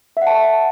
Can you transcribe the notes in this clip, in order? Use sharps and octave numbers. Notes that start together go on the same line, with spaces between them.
E5
F#5
A5